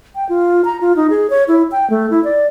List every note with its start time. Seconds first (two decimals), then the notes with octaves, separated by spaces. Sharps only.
0.15 G5
0.29 F4
0.65 A#5
0.81 F4
0.96 D#4
1.10 G#4
1.30 C#5
1.48 E4
1.72 G5
1.90 A3
2.10 E4
2.24 D5